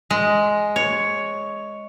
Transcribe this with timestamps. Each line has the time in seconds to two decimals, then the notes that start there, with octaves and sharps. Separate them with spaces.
0.10 G#3
0.76 C#5